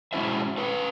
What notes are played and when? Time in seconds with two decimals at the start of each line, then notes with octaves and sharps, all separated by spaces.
0.13 G#3 C#4 E4 F#4 C5 E5
0.57 C#4 B4